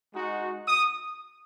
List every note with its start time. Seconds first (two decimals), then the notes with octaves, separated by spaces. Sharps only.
0.14 G#3 D#4 F#4
0.68 D#6